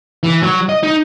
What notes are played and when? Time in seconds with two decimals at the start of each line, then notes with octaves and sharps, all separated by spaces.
0.23 E3
0.43 F#3
0.69 D#5
0.83 D#4